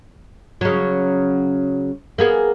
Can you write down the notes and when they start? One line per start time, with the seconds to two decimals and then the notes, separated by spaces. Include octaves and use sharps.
0.61 C#3 F#3
2.18 A#3 B3 G#4